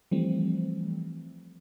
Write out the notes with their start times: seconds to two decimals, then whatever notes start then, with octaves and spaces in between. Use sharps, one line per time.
0.11 E3 F3 G3 A3 C4